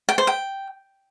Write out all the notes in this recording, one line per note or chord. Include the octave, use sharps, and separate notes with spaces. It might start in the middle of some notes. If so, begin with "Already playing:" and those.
G5
C5
G5